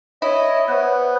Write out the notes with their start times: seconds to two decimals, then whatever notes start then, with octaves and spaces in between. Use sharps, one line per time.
0.22 E4 C#5 D#5
0.68 B3 B4 C5